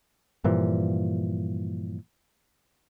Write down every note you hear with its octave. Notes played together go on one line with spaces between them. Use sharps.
G2 A#2 E3 F3